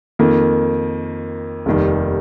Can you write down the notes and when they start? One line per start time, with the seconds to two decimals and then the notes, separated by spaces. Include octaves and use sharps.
0.19 F2 D#3 A#3
1.66 F1 D#2 D#3 G3